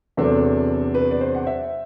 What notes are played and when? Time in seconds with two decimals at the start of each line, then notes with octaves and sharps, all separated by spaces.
0.17 E2 C3 F#3 B3 D4 A4
0.95 B4
1.11 D5
1.21 C5
1.34 F#5
1.47 E5